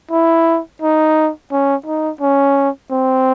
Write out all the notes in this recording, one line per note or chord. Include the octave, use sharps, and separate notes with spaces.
E4
D#4
C#4
D#4
C#4
C4